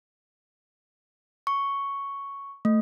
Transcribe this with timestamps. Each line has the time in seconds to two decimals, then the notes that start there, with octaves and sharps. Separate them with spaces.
1.47 C#6
2.65 A3